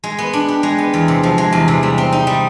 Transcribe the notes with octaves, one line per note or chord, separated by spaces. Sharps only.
G#3
B3
D4
G4
G#3
B3
E2
C3
F3
G#3
E2
C3
G3
C4
D#4
G3